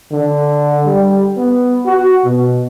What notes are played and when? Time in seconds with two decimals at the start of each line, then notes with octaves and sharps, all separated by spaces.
0.11 D3
0.86 G3
1.37 B3
1.86 F#4
2.25 B2